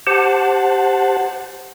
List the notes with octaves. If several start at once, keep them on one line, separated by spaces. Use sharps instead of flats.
G4 C5 F#5 A5